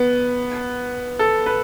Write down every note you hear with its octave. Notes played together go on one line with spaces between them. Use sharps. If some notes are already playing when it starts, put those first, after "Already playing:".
Already playing: B3
A4
B4